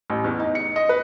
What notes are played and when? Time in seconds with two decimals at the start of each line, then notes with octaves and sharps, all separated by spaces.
0.10 A1
0.24 E2
0.39 D#4
0.55 C#7
0.76 D#5
0.89 B4